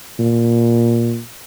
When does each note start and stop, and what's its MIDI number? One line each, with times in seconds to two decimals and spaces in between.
0.19 1.20 46